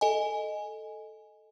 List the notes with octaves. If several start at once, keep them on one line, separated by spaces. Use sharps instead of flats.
A4 D#5 G#5